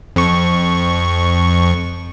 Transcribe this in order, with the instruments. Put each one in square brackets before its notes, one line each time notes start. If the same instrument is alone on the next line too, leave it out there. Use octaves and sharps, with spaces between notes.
[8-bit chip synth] F2 C#6